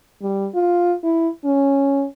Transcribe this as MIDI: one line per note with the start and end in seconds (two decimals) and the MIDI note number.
0.22 0.48 55
0.54 0.94 65
1.04 1.28 64
1.45 2.05 61